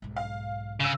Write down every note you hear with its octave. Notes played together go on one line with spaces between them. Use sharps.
B1 G#2
F5
C#3 E6 A#6